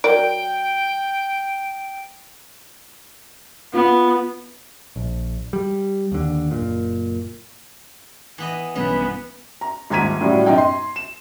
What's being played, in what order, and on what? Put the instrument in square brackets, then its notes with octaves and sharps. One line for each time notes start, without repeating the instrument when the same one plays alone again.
[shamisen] F#3 A#4 D5 [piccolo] G5 [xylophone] D7
[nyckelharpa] B3 [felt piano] F4
[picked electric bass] A#1
G3
D#2 D3
F#1 A#2
[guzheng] E3 B3 D#5
[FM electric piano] B1 G2 C#4 [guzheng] E3 [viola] B3
[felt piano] A#5
D#1 G#2 A#5 G#6 B6 D#7
A2 C#3 F#3 G3
F#2 B2 D#4 G5
C6
E7